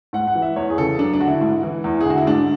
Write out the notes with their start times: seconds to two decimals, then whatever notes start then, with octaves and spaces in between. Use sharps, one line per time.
0.13 G#2 F#5
0.27 F#5
0.35 E3
0.42 E5
0.56 E2 C#5
0.70 G#4
0.78 C#3 E3 A4
0.98 F#2 D4
1.13 D4
1.20 D3 F#4
1.28 E4
1.41 G#2
1.63 E3
1.84 E2
2.01 G#4
2.05 D3
2.10 F#4
2.18 E4
2.27 G#2 D4